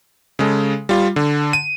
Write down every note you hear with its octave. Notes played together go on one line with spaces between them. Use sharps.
C#3 G#3 A4
G3 F4
D3
D#7